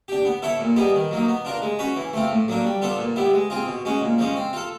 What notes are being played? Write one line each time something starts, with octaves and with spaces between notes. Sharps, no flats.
D4 G4
B3
E4 A4 C#5 E5
A#2
G3 B3 D#4 G#4
D#3
F#3 A#3 D#4
B3
D4 F4 A#4
G#3
C#4 F#4 B4
E3
A3 C4 F4
A2
F#3 A#3 D4
G3
B3 D4 F4 A4
A#2
G3 B3 E4
G#3
C4 F4 G#4
B2
G#3 C#4 F#4
A#2
F3 G#3 C#4
C4
F4 A4